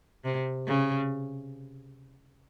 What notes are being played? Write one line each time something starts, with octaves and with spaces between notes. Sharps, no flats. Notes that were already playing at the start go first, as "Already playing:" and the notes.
C3
C#3